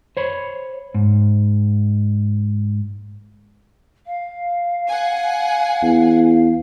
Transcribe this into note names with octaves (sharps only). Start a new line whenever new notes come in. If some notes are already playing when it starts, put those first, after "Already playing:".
C5 C#5 B5
G#2
F5
F#5 G#5
E2